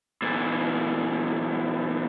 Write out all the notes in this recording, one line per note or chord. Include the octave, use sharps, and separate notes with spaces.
E2 A#2